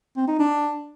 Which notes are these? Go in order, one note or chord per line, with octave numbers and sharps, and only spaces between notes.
C4
D#4
D4